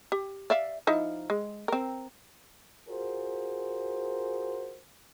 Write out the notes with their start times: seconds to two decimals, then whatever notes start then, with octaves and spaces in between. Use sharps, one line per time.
0.12 G4
0.50 D5 E5 F5
0.87 F3 D#4 E4
1.30 G#3
1.68 C4 A#4
2.88 F4 F#4 G#4 A#4 C5